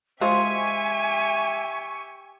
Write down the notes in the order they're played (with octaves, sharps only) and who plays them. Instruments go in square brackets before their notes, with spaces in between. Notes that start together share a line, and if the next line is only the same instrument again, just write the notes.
[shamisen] G#3 F4 C5 [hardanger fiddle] G4 E5 [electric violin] G#5 [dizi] C#6